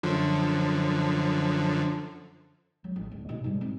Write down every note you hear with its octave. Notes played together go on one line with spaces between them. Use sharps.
F#2 D3 F3
F#3
A1
D1
B2 D#4
G#2 G3
C4